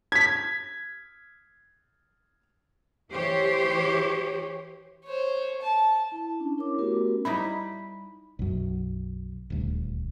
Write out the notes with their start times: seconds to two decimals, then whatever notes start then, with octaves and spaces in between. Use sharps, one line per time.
0.12 G#6 B6
3.12 E3 G4 C5 C#5
5.04 C5 C#5
5.61 A5
6.12 E4 A5
6.40 C#4 D4
6.58 E4 A#4 C#5 D6
6.78 A3 B3 C#4 F#4 G4 A#4
7.25 G3 D#4 E4 B5
8.39 B1 F#2
9.50 D#1 D2